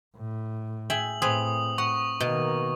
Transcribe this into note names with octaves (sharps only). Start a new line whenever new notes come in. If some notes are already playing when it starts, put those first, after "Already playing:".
A2
G#4 E5 G5 F#7
A2 C4 G#4 B4 D#6
F#5 C#6
B2 D#3 A#3